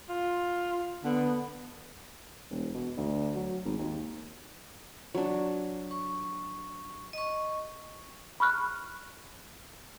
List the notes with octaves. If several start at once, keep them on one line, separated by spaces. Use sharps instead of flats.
F4
D3 B3
E1
B2
D2
F#3
G#1
D#2
F#3 D4
C#6
D#5 C#6
B5 C#6 F6 F#6